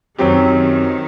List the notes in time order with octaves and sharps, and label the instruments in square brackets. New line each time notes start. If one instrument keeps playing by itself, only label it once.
[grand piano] F#2 F#3 C4 G4 [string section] D#3